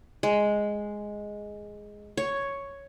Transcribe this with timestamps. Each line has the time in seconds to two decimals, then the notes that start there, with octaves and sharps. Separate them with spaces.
0.23 G#3
2.17 C#5